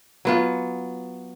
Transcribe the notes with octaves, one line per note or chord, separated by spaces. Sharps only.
F#3 B3 F4